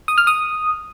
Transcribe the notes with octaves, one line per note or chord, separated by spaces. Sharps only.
D#6
F6
D#6